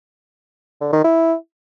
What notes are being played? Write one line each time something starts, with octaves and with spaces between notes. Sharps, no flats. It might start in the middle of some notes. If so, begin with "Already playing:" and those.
D3
D#3
E4